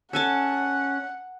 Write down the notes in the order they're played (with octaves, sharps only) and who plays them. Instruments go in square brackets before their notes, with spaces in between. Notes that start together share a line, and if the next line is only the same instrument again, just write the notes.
[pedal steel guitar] C#4 [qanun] A4 G#5 A5 [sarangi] F#5 [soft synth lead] F#6